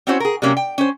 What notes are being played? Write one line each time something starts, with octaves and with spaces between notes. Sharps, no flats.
C4 C#4 E4 F#4 C5 C#5
G#4 A#4
C3 F#3 G3 A#3 C#4
G5
C#4 C5